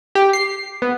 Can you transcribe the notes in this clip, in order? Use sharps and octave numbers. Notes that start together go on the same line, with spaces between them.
G4
C7
B3